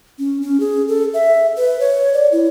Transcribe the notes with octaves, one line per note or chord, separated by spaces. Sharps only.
C#4
C#4
G#4
A4
E5
B4
C#5
D5
E4